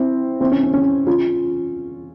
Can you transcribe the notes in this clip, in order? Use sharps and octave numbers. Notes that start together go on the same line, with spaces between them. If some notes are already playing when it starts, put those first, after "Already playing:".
Already playing: C4 E4
C4 E4
C#4
C#4
C#4
C#4 F4